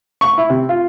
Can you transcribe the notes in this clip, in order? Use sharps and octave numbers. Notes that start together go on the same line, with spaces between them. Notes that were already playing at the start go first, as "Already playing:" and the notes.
C#6
E4
C3
F4